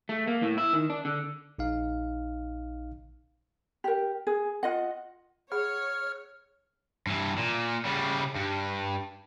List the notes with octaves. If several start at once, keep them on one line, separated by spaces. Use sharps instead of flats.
A3
A#3
A2
E4
D#3
D4
D3
A#1 D#4 F5
G4 A#4
G#4
F4 D#5 F#5
G#4 C#5 F#5 B5 F6
G2 E3
A#2
C#3 G3
G2